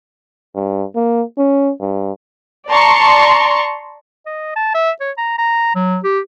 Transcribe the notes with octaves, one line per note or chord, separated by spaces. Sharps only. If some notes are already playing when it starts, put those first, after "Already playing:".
G2
A#3
C#4
G2
D5 A5 A#5 C6 C#6
D#5
A5
E5
C#5
A#5
A#5
F#3
G4